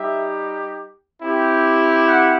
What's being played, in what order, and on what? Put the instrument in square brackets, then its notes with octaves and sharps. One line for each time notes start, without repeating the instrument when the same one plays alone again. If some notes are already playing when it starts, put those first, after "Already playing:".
Already playing: [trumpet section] G3 D#4 G4 E5
C4 E4 G4
F#5